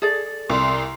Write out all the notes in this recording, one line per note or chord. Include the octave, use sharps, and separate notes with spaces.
G#4 A4 D5
C2 C6